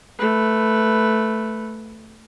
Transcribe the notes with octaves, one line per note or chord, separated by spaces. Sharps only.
A3 B4